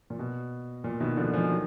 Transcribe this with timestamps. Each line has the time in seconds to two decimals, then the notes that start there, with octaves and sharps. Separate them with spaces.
0.10 A#2
0.19 B2
0.84 A#2
1.00 B2 D#3
1.17 D3 F3
1.33 F3 G#3
1.50 D#3 F#3